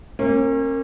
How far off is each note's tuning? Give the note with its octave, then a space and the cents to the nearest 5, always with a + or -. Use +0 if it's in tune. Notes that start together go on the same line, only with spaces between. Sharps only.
A#3 -15 C#4 -40